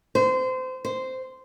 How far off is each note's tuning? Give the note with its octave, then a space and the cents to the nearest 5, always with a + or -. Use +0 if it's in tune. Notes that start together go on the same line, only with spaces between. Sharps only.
C5 -25
C5 -10